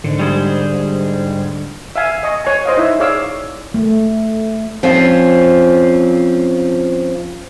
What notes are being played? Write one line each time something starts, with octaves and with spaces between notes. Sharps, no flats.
G#2 D3
G3 G#4 C5
E5 F5 G#5
D#5 G#5 C#6
C#5 G#5
C5 D#5 F5
D#4 E4 E5
G#4 C#5 D5 F5 D6 E6
A3
F3 C4 C#4 F4